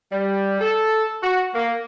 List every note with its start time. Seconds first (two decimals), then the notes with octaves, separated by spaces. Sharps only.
0.12 G3
0.61 A4
1.22 F#4
1.54 A#3